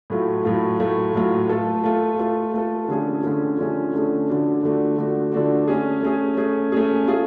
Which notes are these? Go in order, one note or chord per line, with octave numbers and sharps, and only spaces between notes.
A2 F#3 A3 F4
A2 F#3 A3 F4
A2 F#3 A3 F4
A2 F#3 A3 F4
A3 F4 A4
A3 F4 A4
A3 F4 A4
A3 F4 A4
D3 F3 A3 C#4 G#4
D3 F3 A3 C#4 G#4
D3 F3 A3 C#4 G#4
D3 F3 A3 C#4 G#4
D3 F3 A3 D4 F#4
D3 F3 A3 D4 F#4
D3 F3 A3 D4 F#4
D3 F3 A3 D4 F#4
A3 C#4 G#4
A3 C#4 G#4
A3 C#4 G#4
A3 C#4 G#4
A3 F4 G#4